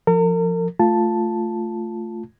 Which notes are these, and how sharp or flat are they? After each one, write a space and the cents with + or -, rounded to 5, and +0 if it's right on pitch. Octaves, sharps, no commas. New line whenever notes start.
F3 +0 A#4 -40
A3 +0 F4 +0 A5 +0